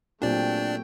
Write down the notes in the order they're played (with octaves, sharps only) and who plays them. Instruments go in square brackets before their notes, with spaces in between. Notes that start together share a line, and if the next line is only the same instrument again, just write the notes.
[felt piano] A#2 [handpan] F#3 C4 G4 [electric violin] A3 G5 [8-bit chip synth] D4 D5